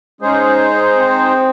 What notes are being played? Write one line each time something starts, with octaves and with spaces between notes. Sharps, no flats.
G#3 C#4 D#4 G#4 C5
C4